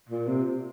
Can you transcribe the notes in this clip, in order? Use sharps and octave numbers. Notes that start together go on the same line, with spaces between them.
A#2
C3